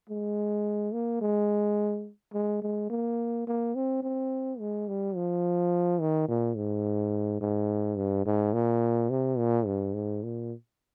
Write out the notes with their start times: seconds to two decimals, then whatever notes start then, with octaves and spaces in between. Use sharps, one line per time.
0.09 G#3
0.93 A#3
1.22 G#3
2.34 G#3
2.62 G#3
2.90 A#3
3.47 A#3
3.75 C4
4.03 C4
4.60 G#3
4.88 G3
5.16 F3
6.01 D#3
6.29 A#2
6.57 G#2
7.41 G#2
7.97 G2
8.26 G#2
8.54 A#2
9.10 C3
9.38 A#2
9.66 G2
9.94 G#2
10.23 A#2